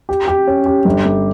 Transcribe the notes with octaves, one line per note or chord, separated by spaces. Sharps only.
G4
G4
C#4
G4
G1
G1